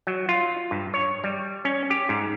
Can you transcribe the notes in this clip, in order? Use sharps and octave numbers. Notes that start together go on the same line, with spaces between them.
F#3
F4
G2
C#5
G3
C#4
G4
G#2